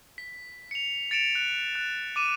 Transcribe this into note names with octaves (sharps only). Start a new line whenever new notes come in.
B6
C#7 F7
A6 C#7 D7 E7 F7
F#6
F#6
D6 D#7 E7